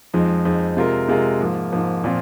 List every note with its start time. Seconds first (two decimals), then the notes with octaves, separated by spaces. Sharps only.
0.14 F2 F3 G#3 D#4
0.45 F2 F3 G#3 D#4
0.77 C3 G#3 F4 A#4
1.08 C3 G#3 F4 A#4
1.39 G#2 F3 A#3
1.72 G#2 F3 A#3
2.04 A#2 F3 C4 F4